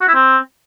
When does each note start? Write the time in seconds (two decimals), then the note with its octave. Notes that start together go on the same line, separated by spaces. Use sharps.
0.01 F#4
0.08 E4
0.14 C4